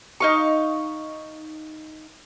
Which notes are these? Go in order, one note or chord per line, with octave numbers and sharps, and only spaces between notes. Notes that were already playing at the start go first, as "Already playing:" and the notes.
D#4 F5 C#6